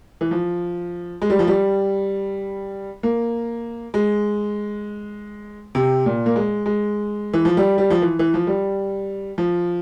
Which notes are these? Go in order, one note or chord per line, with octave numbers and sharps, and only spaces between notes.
E3
F3
G#3
G3
F3
G3
A#3
G#3
C3
A#2
A#3
G#3
G#3
E3
F3
G3
G3
F3
E3
E3
F3
G3
F3